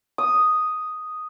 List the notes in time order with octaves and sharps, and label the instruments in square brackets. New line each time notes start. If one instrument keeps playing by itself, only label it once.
[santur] D#6